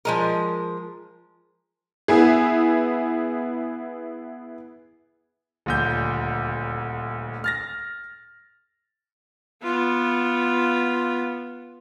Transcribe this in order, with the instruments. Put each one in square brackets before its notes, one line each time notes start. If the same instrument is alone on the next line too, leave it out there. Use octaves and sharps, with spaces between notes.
[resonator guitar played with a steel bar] F3 G#3 A#4
[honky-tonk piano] B3 E4 G#4
[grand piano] D#1 D2 G6
F6 A6 A#6
[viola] B3 F4